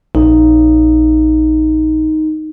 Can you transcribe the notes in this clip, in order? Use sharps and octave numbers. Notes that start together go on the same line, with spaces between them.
A#1 D#4